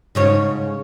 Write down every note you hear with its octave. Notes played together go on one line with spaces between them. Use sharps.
G#2 C#3 C#5